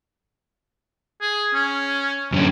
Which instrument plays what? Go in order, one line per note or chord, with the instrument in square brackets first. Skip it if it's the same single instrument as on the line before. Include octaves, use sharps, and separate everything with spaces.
[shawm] G#4
C#4
[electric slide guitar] F#2 D3 C#4